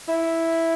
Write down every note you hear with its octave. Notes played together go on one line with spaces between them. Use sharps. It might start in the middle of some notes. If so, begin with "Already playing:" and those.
E4